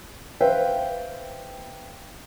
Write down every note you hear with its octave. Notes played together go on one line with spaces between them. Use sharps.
B4 C5 E5 F5 G5